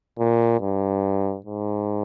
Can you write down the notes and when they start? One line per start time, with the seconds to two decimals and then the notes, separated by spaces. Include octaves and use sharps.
0.18 A#2
0.60 G2
1.46 G#2